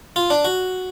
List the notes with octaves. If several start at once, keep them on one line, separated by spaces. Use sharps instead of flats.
F4
D4
F#4